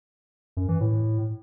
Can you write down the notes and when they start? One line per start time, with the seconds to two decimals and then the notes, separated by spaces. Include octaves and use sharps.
0.57 F#2
0.69 E3
0.80 A2